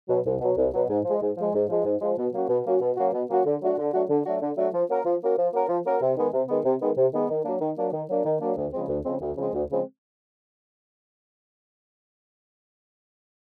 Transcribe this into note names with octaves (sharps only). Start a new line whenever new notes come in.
B2 F#3
C2
B2 F#3
C2
B2 F#3
G#2
F3 G#3
G#2
F3 G#3
G#2
F3 G#3
G#2
F3 G#3
B2
F#3 A#3 C#4 F#4
B2
F#3 A#3 C#4 F#4
B2
F#3 A#3 C#4 F#4
B2
F#3 A#3 C#4 F#4
D3
F#3 A3 D4 F#4
D3
F#3 A3 D4 F#4
D3
F#3 A3 D4 F#4
D3
F#3 A3 D4 F#4
F3
A#3 C#4 F#4 A#4
F3
A#3 C#4 F#4 A#4
F3
A#3 C#4 F#4 A#4
F3
A#3 C#4 F#4 A#4
C3
D#3 G#3 B3
C3
D#3 G#3 B3
C3
D#3 G#3 B3
C3
D#3 G#3 B3
D#3
F#3 A#3 D4
D#3
F#3 A#3 D4
D#3
F#3 A#3 D4
D#3
F#3 A#3 D4
D2
C#3 F3 G#3 C4
D2
C#3 F3 G#3 C4
D2
C#3 F3 G#3 C4
D2
C#3 F3 G#3 C4